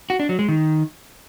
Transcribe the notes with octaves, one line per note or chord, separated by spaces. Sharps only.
F#4
D4
F#3
G#3
D#3